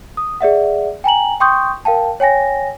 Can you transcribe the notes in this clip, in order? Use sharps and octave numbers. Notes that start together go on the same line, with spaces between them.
D#6
G#4 D5 E5 F#5
G5 G#5 A#5 F#7
G5 C6 C#6 D#6 G6
A#4 F5 G5 A5
C#5 G5 G#5 A#6